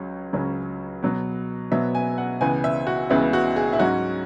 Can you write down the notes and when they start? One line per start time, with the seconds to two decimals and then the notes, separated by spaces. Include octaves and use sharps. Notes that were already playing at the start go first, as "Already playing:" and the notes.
Already playing: C#2 C#3 F#3 C#4
0.33 C#2 C#3 F#3 C#4
1.03 B2 F#3 B3
1.71 B2 F#3 B3 E5
1.95 G#5
2.18 F#5
2.41 C#2 C#3 E3 B3 G#5
2.64 E5
2.87 F#4
3.10 C#2 C#3 E3 B3 E4
3.33 F#4
3.56 G#4
3.73 E4
3.79 G#2 F#3 C#4 F#4